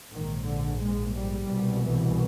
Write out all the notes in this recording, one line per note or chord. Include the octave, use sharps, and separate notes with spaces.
A#1 G#2 D#3
D3
G#3
G3
C2 B2
E3